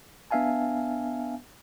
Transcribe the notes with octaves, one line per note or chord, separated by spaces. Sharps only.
B3 D4 E5 F5 G#5 A5